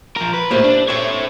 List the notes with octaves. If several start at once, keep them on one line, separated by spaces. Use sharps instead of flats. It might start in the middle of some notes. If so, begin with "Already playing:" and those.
F3 A#4
B4
A2 A#3 G4 C5 E5
D4
C4 A4 C#5 E5